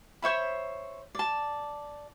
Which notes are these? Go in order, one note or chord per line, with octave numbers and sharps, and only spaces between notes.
C5 C#5 E5 B5
D5 A5